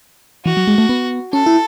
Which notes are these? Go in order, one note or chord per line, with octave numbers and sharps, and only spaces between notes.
E3 F#4
F#3
G#3
A3
B3
C#4 A4
E4